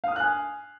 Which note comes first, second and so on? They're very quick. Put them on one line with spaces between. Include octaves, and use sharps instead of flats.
F5 D#6 F6 F#6 G#5